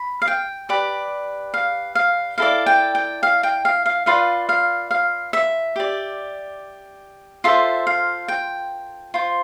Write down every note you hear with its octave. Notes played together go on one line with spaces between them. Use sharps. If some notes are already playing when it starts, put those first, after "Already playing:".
Already playing: B5
F5
G5
G4 B4 D5
F5
F5
E4 A4 D5 F5
G5
G5
F5
G5
F5
F5
F4 B4 D5 F5
F5
F5
E5
G4 D5
F4 A4 C5 E5
F5
G5
F4 C5